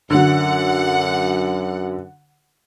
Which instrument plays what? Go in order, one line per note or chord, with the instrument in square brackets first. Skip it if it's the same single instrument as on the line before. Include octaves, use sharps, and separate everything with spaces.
[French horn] F#2 [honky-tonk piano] D3 F#3 [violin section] F#5